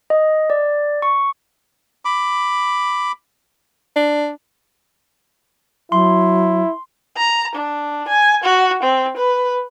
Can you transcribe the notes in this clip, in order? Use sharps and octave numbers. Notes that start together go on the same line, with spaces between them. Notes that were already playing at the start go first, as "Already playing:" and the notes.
D#5
D5
C#6
B5 D6
D4
F#3 E4 C6
A#5
D4
G#5
F#4
C4
B4